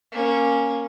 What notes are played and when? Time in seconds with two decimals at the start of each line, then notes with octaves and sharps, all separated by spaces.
0.12 A#3 C#4